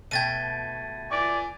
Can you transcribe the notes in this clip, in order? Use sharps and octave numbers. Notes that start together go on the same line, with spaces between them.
B2 A3 G5 G#6 A6 D#7
D5 G#5 D6